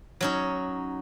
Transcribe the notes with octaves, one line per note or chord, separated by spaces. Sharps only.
F#3 C#4 D#4